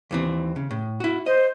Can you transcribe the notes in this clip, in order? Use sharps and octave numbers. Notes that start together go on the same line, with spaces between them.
D#2 E3 C4
C#3
A2
E4 F#4
C5 D#5